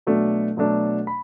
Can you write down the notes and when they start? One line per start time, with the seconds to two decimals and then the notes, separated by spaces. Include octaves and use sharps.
0.07 B2 F#3 A3 D4
0.57 B2 F#3 A3 D4
1.07 B5